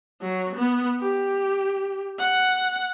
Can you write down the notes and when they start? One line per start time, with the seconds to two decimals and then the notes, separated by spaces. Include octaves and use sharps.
0.22 F#3
0.56 B3
1.00 G4
2.18 F#5